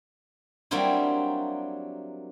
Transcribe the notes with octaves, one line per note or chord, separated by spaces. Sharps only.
F#3 G3 A#3 C4 D4 E4